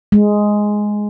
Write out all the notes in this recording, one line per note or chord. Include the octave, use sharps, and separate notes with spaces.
G#3